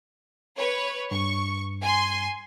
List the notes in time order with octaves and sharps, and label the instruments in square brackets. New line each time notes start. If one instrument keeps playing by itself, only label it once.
[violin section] B4 C#5
[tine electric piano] G2 [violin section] C#6
[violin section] G#5 C6